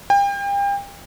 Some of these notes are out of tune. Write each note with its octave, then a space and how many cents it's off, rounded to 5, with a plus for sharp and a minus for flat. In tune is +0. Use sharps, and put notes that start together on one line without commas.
G5 +35